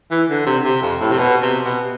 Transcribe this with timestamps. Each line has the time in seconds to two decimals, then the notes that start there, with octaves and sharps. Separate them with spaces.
0.11 E3
0.29 D3
0.46 C3
0.65 C3
0.82 F2
1.01 A2
1.12 C3
1.18 B2
1.42 C3
1.65 B2